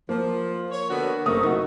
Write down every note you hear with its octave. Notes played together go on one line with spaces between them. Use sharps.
F3 A#3
C#5
D3 B3 F#4
F#1 C3 A3 A#4 D#6
D#4 F#4